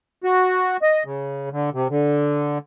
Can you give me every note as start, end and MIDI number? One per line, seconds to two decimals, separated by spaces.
0.24 0.77 66
0.82 1.04 75
1.05 1.49 49
1.52 1.70 50
1.73 1.88 48
1.90 2.58 50